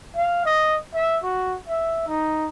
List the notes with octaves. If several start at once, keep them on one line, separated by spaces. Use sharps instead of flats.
F5
D#5
E5
F#4
E5
D#4